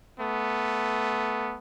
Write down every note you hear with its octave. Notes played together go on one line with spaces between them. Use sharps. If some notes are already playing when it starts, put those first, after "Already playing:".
A3 B3